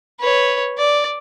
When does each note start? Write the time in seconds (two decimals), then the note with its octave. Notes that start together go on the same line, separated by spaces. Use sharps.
0.20 B4 C#5
0.78 D5